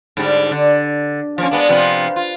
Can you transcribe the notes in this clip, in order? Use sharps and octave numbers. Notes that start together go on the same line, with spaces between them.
G#2 D3 G3
D3
F3 A#3 C#4
G#3 B3 D4
C3 F3 B3
F4